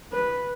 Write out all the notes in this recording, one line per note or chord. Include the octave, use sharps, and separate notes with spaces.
B4